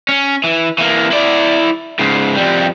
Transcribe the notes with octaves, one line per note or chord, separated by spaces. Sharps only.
C#4
E3
E3 A#3
E4 D5
G#2 C#3
F2 G3